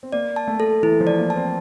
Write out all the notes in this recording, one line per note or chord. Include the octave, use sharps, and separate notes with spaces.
C4
A#3 D5
A5
A3
A4
E3 E4
F3
D5
A#3
A5
C4